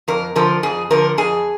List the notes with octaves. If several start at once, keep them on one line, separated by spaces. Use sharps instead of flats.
F2 A#4
D3 F3 A#4
F2 G#4
D3 F3 A#4
F2 G#4